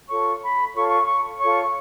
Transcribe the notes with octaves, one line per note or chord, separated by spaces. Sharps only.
F4 A4 C#5 C#6
B5
F4 A4 C#5 C#6
C#6
C#6
F4 A4 C#5 C#6